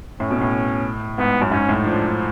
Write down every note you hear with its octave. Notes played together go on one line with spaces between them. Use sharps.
A2 C#4
B2
A2
G#2 B3
F#2
G#2 C#4
A2
F3 D4